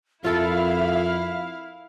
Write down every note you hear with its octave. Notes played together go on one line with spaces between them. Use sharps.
F2 E4 F4 A4 A#4 E5 F5